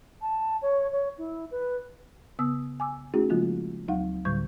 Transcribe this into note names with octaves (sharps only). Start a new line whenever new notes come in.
A5
C#5
C#5
E4
B4
C#3 B3 D#6 E6
G#5 D6 E6
A3 C#4 D#4 E4 F#4 G#4
C#3 F3 G#3 A#3 F4
D2 F#3 D#4 F5 F#5
D2 A2 D3 G3 C#6 G6